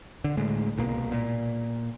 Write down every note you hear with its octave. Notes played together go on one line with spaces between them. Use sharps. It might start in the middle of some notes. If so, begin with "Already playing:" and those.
D3
D2 A2 G#3
C2 B2 A#3
A#2